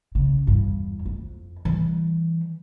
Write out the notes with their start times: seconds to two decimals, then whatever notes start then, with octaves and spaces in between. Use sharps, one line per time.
0.15 C#3
0.47 E2 G2
1.06 F2
1.65 E3 G3